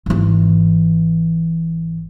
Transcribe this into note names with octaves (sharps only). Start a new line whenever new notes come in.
G#1 E3